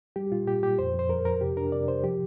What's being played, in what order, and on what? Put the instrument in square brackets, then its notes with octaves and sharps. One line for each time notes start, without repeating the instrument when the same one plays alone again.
[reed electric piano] G3 G4
A#2 F4
A#2 G4
A#2 G4
F2 C5
F2 C5
F2 A#4
F2 A#4
C3 G4
D4 A#4
C3 D5
C3 C5
F3 G4